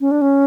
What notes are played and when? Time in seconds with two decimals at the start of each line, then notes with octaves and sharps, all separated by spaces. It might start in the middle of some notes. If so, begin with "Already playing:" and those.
0.01 C#4
0.11 D4
0.22 C#4